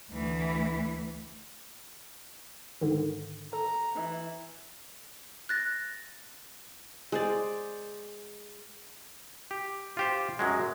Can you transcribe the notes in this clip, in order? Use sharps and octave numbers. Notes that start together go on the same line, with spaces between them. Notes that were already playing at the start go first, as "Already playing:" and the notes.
D2 E3
G#2 D3 D#3
A4 A#5
E3
F#6 A6 A#6
G#3 C5 D5
G4
F4 G4 C5
F#2 F#3 G#3